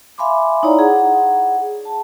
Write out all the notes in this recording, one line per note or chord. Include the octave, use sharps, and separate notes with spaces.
E5 F5 G#5 B5 C6 D6
D#4 E4 C#5 D5 A#5
G#4 F#5
A5